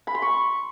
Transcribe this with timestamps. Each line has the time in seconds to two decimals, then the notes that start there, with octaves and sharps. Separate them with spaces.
0.07 B5
0.15 C6
0.22 C#6